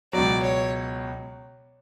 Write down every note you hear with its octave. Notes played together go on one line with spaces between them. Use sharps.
C#2 B2 F#3 D5
C#5